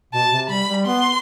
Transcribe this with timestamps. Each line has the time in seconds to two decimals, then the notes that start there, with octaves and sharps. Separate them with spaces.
0.13 B2 A5
0.32 C3
0.50 G3 B5
0.69 G3
0.86 B3 C6